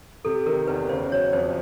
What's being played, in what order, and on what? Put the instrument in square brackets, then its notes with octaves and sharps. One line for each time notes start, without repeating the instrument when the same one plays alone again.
[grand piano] C3 [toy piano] A4
[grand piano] D#3 [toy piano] A#4
[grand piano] E2 [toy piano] B4
[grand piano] C#3 [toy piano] C5
[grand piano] F#3 [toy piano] C#5
[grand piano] F2 [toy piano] C5